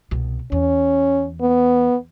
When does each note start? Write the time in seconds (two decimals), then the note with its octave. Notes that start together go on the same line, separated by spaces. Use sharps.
0.11 C2 B2
0.52 E2 C#4
1.42 B3